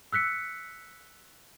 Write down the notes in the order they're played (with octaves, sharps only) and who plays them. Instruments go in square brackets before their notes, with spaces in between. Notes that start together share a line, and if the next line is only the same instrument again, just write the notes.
[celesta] E6 F#6 B6 C#7